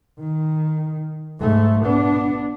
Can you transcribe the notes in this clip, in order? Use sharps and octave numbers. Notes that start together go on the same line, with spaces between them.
D#3
G#2 A3
B3 D4